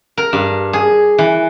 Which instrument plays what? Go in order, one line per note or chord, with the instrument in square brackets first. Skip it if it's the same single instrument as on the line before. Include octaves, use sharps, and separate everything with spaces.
[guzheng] A#4
G2
G#4
E3